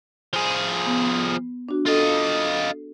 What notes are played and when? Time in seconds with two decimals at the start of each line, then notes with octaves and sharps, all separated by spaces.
0.33 F3 G#4
0.86 B3
1.69 D4 F#4
1.86 F4 A4 D#5